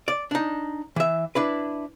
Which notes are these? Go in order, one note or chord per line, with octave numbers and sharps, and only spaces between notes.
D5
D4 D#4
E3 E5
D4 E4 B4